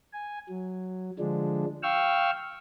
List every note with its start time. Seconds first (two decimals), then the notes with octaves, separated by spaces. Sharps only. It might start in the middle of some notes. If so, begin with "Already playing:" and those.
0.13 G#5
0.49 F#3
1.19 D3 F3 G#3 D4
1.83 F5 G5 C#6 E6 F6